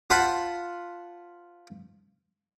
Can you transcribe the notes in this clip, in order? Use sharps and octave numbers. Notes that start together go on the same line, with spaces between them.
F4 C5 F#5 A5 B5 C6